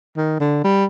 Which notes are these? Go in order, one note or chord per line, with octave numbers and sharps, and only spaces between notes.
D#3
D3
G3